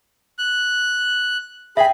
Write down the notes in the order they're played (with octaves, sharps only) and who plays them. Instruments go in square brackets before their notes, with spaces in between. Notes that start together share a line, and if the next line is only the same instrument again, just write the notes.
[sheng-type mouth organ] F#6
[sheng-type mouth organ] G#4 B5 [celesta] E5 G5